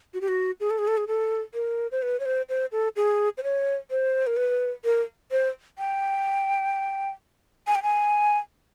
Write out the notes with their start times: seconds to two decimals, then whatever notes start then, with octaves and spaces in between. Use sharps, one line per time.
0.14 F#4
0.21 G4
0.28 F#4
0.60 G#4
0.70 A4
0.78 G#4
0.88 A4
0.97 G#4
1.08 A4
1.54 A#4
1.92 C5
2.02 B4
2.20 C#5
2.25 C5
2.49 C5
2.72 A4
2.96 G#4
3.38 C5
3.43 C#5
3.90 C5
4.27 A#4
4.37 B4
4.85 A#4
5.31 C5
5.78 G5
7.67 G#5
7.75 G5
7.83 G#5